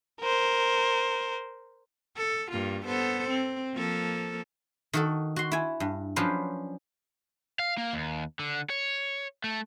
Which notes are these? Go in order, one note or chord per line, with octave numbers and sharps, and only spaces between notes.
A#4 C5
A4
G2 A#3 F4
B3 A4 C5
C4
F3 A#3 A4
D#3 F#4 A4
F#4 C6
E4 G#5
G2
F3 F#3 C#4 D4 B4 C5
F5
A#3
D#2
D3
C#5
A3